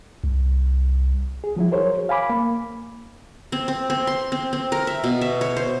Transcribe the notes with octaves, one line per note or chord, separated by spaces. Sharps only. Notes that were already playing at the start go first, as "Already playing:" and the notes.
C2
G#4
F3 F#3 E4
F#4 G#4 A#4 C5 C#5
F5 G#5 B5 D6
A#3
C4
C4
C4
C6
C4
C4
A#4
E5
B2
E5
C#5
C5